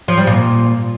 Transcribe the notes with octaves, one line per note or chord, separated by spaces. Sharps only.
F3
G3
A#2